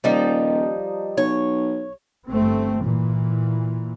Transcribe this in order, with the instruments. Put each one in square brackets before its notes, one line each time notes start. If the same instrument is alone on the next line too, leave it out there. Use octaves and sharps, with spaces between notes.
[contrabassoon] D#1 [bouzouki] F3 G3 D#4
[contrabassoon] B1 [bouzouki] C#5
[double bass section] G1 A3 C4
A#2 E3